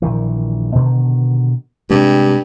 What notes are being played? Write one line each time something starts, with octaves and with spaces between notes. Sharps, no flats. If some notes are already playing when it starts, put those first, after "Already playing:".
A#1 D#3 E3
B2 D3 D#3
G2 C3 G#3